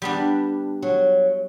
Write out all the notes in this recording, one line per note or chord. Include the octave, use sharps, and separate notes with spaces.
G3 B3 D4
F#3